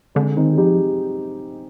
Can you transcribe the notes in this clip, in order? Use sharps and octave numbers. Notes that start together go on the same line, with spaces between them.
D3 G#3 C4
D#3 C4 D#4
G#4
F3 D#4 G4